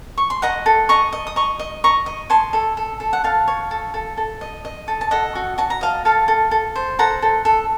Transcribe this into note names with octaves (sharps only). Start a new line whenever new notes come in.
C#6
C6
D#5 F#5 A#5
A4
D#5 A#5 C#6
D#5
D#6
D#5 A#5 C#6
D#5
D#5 A#5 C#6
D#5
C#5 A5 C6
A4
A4
A4
F#5
A4 F5 A5
C#5
A4
A4
A4
D#5
D#5
A4
A5
A4 D#5 F#5
F#4
F#4 A5
A#5
D#5 F5 A5
A4 F5 A5
A4
A4
C5
A4 F#5 A#5
A4
A4